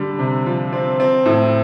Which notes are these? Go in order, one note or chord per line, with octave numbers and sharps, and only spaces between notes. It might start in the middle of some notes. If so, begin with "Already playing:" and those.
Already playing: D3 G3
C3
F3
C4
C4
A2